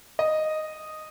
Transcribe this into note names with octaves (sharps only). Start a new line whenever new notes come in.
D#5